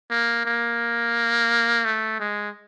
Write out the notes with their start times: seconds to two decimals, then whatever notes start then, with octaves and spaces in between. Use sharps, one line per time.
0.10 A#3
0.45 A#3
1.85 A3
2.20 G#3